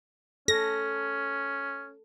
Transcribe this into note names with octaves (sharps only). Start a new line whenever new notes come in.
C#4 A4 A#6